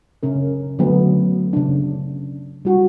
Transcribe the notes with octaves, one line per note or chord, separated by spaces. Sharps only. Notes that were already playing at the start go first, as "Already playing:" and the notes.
C#3 C#4 A#4
D3 F#3 A3 B3
C#3 D4
G3 F#4